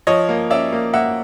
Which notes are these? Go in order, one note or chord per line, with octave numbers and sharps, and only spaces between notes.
F3 C#5 D#5
A#3
C#4 D5 E5
A#3
A#3 E5 F#5